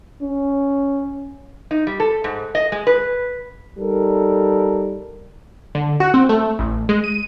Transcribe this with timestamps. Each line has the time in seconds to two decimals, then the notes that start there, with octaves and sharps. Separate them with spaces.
0.22 C#4
1.71 D#4
1.87 G3
2.00 A4
2.24 G#2
2.55 D#5
2.72 G#3
2.87 B4
3.78 G3 D#4 A4 A#4
5.75 D3
6.00 F#4
6.14 C4
6.29 A3
6.59 A1
6.89 G#3
7.04 D#7